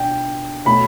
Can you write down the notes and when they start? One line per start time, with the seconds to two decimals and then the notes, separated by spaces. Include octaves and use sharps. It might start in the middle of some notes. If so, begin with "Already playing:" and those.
Already playing: B2 D4 G5
0.65 B2 A3 C#4 B5